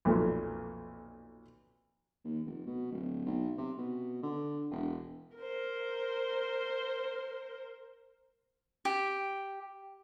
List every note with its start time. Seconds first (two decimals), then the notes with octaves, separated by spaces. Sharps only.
0.05 B1 F2 A#2 A3
2.25 D#2
2.46 F1
2.66 B2
2.92 D1
3.26 B1
3.58 C3
3.78 B2
4.23 D3
4.71 E1
5.37 A#4 C5
8.85 G4